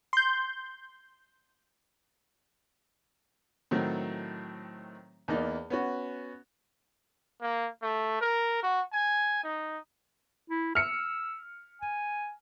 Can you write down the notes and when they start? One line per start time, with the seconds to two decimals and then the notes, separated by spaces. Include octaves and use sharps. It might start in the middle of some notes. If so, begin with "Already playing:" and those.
0.13 C6 G6
3.71 A2 D#3 F#3 A3 C4
5.28 E2 A#3 D#4 D5
5.70 B3 C#4 F#4
7.41 A#3
7.82 A3
8.21 A#4
8.63 F#4
8.93 G#5
9.43 D#4
10.50 E4
10.75 E6 F6 C#7
11.82 G#5